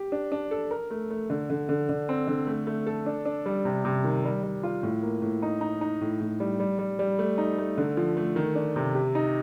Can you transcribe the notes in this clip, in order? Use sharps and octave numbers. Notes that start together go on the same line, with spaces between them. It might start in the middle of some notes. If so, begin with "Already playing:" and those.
Already playing: G4
D4
D4
A4
A#4
A3
A3
D3
D3
D3
D3
C4
D3
A3
A3
A4
D4
D4
G3
C3
C3
D#3
G3
G3
F4
A2
A#3
A2
D#4
D#4
D#4
A2
A2
G3
G3
G3
G3
A3
D#4
A3
D3
F3
A3
D#3
D4
C3
G4
D#4